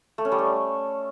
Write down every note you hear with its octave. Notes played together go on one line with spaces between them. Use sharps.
A3
C#4
G3
A3